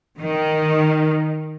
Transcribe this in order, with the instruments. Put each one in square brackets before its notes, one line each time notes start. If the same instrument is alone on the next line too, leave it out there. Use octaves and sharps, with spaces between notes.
[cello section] D#3